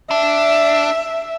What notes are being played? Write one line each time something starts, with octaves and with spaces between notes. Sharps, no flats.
D4 E5